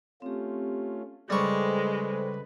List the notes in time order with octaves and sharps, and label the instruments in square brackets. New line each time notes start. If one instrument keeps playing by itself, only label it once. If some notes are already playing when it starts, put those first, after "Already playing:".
[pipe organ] A3 C#4 F4 [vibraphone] C4 G4
[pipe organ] C#3 B4 [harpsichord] G3 C#6 [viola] G#3 [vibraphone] A4 C5 G5